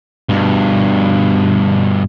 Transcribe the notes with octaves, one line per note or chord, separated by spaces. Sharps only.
G2 B2